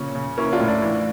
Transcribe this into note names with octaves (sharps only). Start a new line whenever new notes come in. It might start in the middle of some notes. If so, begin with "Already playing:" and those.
Already playing: A#2 C#3 C#4
C#3
A#3 C#4 E4
D4 F4
A2
D4
E3